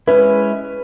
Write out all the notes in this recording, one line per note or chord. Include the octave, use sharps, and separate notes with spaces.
G#3 C#4 E4 B4